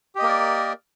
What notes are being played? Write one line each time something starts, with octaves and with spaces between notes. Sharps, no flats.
A#3 G4 A#4 D5 D#5